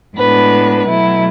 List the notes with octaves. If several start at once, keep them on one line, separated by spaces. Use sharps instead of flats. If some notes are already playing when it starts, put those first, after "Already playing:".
A2 G#3 B3 D4 B4
B2 F#3 A3 E4